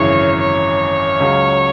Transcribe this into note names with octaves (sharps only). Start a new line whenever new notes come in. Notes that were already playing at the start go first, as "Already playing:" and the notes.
Already playing: G#1 F#2 C#3 E3 C#5
C#5
C#2 C#3 F#3